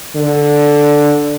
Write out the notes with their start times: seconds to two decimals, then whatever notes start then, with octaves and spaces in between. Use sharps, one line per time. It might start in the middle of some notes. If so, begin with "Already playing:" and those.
0.15 D3